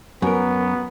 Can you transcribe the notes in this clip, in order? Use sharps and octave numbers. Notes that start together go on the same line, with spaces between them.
F#2 B3 A#4